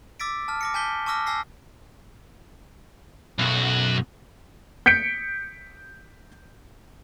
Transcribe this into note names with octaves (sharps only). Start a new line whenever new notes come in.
D6 E6 A6 B6 D7
A5 F6
D6 A#6 C#7
G#5 A5 G6 B6 G7
A5 C#6 D6 E6 F6 A#6
G#5 A5 E6 A#6 C7
B1 F#2 F#4
G6 B6 C#7 D7